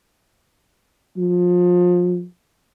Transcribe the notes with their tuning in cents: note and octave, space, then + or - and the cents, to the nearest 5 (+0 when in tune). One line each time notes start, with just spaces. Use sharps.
F3 +30